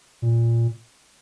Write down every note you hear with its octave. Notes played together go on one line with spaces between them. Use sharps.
A#2